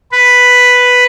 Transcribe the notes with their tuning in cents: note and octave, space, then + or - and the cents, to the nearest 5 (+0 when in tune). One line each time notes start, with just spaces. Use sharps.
B4 +0